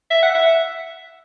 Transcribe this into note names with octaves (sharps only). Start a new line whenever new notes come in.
E5
F#5
E5